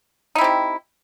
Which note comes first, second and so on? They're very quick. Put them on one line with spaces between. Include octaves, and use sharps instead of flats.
D#4 E4 C4 G4